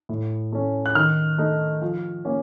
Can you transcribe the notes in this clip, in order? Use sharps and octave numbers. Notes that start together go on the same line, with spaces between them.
A2
A3 C#4
F#6
D#3 F6
A3 D#4
F3
A#3 C#4